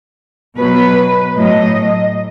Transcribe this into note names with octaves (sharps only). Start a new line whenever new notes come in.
B2 F#3 B4
A2 F#3 D#5